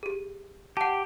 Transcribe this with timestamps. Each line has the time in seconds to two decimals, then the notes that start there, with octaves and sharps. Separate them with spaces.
0.03 G4 G#4
0.77 G4 F#5 A5